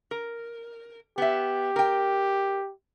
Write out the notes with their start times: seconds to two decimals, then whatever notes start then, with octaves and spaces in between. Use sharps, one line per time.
0.11 A#4
1.18 B3 G4 E5
1.76 A#4 G5